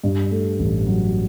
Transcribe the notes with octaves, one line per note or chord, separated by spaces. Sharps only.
G2
A3
A1
F#3